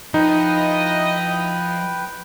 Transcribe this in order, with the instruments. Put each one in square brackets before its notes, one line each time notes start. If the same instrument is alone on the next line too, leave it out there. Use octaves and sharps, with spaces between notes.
[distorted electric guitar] F3 [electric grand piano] D#4 [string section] E4 D#5 [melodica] B4 G5